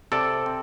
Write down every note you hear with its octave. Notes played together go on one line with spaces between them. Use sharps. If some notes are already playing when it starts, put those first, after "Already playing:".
C3 A4 D5
C4